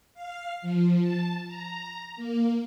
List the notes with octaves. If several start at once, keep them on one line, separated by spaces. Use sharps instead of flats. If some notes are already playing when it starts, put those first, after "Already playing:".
F5
F3
A5
A#5
A#3